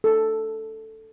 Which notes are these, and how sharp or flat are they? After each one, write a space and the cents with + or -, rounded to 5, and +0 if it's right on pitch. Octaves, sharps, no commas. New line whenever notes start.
A4 +5